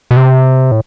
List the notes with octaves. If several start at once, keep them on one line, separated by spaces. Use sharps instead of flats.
B2
C3
A2